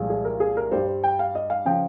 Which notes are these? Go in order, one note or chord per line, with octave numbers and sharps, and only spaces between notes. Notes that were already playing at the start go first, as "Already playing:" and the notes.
Already playing: C2 A#2 F3 G#3
G#4
A#4
G#4
A#4
G2 G3 C5
C5
G5
F5
D#5
F5
C#3 F3 G5